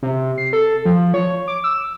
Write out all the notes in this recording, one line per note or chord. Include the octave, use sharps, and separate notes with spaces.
C3
C7
A4
F3
C#5
D6
E6